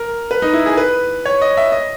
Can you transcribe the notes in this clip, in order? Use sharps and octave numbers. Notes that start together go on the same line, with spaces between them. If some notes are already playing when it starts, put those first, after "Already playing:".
Already playing: A#4
B4
D#4
E4
G#4
B4
C#5
D#5
E5
D#5